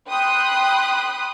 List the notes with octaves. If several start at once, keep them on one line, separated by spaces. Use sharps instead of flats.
G5 B5 C6 D#6 F#6